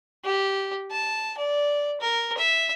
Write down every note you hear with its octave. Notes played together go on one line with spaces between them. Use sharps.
G4
A5
D5
A#4
E5